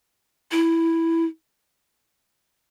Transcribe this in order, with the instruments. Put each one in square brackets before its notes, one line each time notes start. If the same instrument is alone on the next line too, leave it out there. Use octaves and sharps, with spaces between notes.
[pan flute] E4